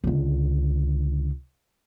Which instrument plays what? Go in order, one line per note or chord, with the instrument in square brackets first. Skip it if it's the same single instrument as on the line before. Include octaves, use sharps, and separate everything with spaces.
[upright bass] C#2 D3